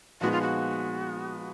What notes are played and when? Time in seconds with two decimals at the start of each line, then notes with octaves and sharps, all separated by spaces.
0.21 A#2 F3 G#3 B3 D#4 F#4
0.32 F4
0.41 F#4